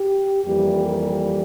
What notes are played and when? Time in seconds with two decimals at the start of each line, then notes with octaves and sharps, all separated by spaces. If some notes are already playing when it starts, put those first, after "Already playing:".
Already playing: G4
0.44 F2 E3 G3 A#3 G4
0.85 A#4